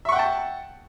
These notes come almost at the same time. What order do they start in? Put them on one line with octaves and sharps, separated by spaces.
E5 C#6 F#5 G5 A5